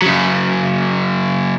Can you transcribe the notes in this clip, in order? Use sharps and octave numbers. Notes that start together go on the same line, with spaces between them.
C#3 F#3